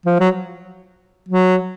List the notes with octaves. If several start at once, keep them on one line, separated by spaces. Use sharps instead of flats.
F3
F#3
F#3